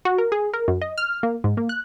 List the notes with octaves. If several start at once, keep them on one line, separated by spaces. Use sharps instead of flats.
F#4
A#4
G#4
A#4
F#2
D#5
F6
A#3
G#2
A#3
F#6